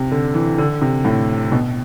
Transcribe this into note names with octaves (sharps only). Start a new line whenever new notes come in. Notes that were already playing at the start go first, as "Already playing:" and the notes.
Already playing: C3
D3
E3
D3
C3
A2
B2